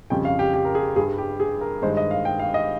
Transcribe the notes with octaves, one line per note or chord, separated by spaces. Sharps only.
F2 C#3 G3 G5
F5
G4
G4
A#4
G#4
G2 G3 G#4
G4
G#4
A#4
G2 D#3 G#3 C5
D#5
F5
G5
F5
D#5